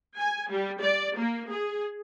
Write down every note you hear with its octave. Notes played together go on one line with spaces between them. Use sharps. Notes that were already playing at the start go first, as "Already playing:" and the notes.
G#5
G3
D5
A#3
G#4